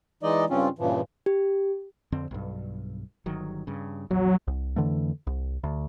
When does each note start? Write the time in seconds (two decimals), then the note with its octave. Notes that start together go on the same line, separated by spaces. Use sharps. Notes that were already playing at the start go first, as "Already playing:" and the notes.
0.23 E3 G#3 D#4 D5 D#5
0.50 G2 C#3 C4 C#4 F4
0.79 G2 A#2 C#3 E3 F3
1.26 G4
2.12 F2 D3 C4
2.31 B1 G2
3.26 G1 D#3 F#3
3.67 G2 C#3
4.11 A#1 E2 F#3
4.48 C2
4.76 F2 D3 E3 A3
5.27 C2
5.64 D2